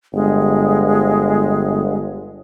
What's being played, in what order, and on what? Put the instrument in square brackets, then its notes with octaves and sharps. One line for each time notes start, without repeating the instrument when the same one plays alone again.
[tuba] G1 [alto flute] G#3